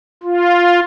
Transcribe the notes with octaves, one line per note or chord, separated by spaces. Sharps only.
F4